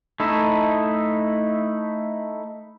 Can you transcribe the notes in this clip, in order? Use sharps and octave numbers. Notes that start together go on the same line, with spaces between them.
A3 D#4 E4